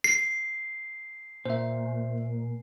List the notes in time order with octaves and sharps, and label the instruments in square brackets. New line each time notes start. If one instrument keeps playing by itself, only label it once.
[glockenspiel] C7
[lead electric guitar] A#2 [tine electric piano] C5 E5